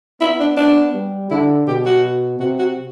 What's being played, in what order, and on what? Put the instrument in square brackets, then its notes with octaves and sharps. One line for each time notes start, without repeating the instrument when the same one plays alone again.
[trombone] B3 [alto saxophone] E4
[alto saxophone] D4
D4
[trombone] G3
[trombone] D3 [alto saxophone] E4
[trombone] B2 [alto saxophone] G4
[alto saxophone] F#4
[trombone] C3 [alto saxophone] F#4
[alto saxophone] F#4